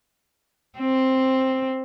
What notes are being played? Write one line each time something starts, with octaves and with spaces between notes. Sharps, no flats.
C4